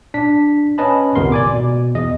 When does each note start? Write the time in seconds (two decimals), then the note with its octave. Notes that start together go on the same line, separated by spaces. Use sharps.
0.14 D4 B6
0.78 C#4 B4 D#5 A5 B5
1.16 G#1 C#2 C3 B3 A#4 C6
1.32 D5 G#5 D6
1.53 B2
1.95 E2 D#5